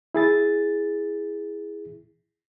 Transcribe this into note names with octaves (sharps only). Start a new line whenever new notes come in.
E4 G#4 A6